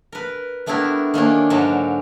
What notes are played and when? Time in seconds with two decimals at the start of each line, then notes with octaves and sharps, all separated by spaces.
0.12 A#4 B4
0.66 G3 A3 B3 D4 E4 A#4
1.14 D#3 A#3 C#4 D4
1.50 G#2 D3 F#3 A4 A#4 A5